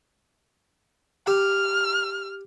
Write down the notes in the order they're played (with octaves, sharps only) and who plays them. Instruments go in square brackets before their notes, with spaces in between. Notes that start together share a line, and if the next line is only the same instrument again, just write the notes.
[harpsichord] G4 [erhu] F6